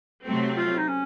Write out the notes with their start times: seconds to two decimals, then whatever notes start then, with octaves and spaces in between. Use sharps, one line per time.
0.25 C3 F#3 A3 C4
0.56 F4
0.77 D#4
0.88 C#4